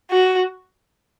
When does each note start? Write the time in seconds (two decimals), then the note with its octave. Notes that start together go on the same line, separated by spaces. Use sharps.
0.11 F#4